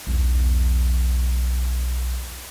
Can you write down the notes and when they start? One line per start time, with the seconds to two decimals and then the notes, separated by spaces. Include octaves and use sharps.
0.07 B1 E2